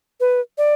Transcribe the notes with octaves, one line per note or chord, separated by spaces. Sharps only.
B4
D5